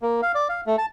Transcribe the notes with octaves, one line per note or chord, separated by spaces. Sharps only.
A#3
F5
D5
F5
A3
A5